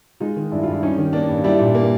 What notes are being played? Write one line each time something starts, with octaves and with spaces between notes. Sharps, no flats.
G#3 D#4 F4
D#3
G2 D4 E4
G2 F4
E4
G3 C#4 D#4
D#3
A#3 D4
G2
G3 D4 E4
A#2
A#3